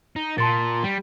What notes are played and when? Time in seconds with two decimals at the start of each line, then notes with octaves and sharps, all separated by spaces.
0.16 D#4
0.38 A#2 A5 C6 A6
0.84 G3